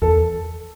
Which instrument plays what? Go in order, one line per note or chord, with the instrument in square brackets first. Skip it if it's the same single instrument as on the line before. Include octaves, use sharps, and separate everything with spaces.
[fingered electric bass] E2 [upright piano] A4